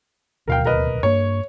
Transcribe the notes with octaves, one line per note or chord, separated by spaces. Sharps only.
D1 D#2 B2 A#4 F5 G5
A#4 B4 D#5
G2 A#3 C#5